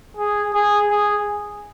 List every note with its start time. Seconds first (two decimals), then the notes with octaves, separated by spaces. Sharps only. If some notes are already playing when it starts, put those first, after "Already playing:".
0.17 G#4
0.53 G#4
0.91 G#4